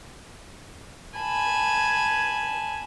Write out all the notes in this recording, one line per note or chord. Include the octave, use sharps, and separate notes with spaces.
G#5 A5 B5